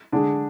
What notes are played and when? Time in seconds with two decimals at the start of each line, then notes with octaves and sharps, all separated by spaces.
0.12 D3 G#3 D4